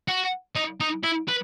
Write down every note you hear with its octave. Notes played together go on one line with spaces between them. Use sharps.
F#4
D#4
D#4
E4
B4